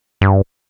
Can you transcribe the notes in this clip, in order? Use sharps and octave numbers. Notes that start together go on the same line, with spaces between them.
G2